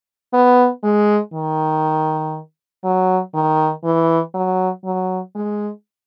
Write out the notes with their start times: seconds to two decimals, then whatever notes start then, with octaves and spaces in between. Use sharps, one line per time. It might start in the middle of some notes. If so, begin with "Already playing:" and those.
0.33 B3
0.84 G#3
1.33 D#3
2.84 F#3
3.34 D#3
3.84 E3
4.34 F#3
4.84 F#3
5.35 G#3